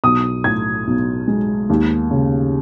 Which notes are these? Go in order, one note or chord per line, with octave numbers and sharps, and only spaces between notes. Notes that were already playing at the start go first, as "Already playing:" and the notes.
B1 D#6
A2 G#6
B1
G#3
D#2
C#3